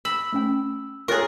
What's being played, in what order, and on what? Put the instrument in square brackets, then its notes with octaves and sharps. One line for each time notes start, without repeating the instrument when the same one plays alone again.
[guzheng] B5 [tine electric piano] E6
[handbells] A3 C#4 G5
[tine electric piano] F4 C#5 G#5 [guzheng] G#4 A#4 [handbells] C#6 F#6 A6